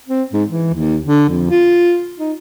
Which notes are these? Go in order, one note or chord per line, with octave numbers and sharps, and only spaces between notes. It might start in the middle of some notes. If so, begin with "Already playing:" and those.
C4
G#2
E3
D#2
D3
F2
F4
D#4